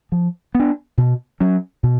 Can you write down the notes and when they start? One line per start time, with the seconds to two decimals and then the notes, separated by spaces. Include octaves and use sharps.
0.12 F3
0.55 B3
0.60 D4
0.98 B2
1.40 F#3 C#4
1.83 B2